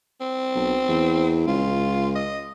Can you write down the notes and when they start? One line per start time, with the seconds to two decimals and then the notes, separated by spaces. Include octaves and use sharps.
0.21 C4
0.55 B1
0.88 E2
1.47 C#2 F4
2.15 D#5